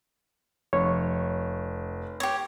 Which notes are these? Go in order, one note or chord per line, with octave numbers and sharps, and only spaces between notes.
F1 C#5
G4 C#5